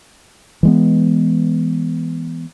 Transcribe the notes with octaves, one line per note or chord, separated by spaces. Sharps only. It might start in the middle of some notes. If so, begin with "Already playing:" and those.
E3 G#3 B3